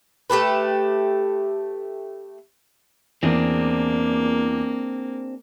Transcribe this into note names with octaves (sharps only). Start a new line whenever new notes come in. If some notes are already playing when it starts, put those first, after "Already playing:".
A3 G4 A4 B4
E2 A#3 C4 D4 G#4